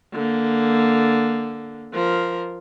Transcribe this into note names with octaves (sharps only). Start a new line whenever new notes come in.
D3 A#3
F3 A#4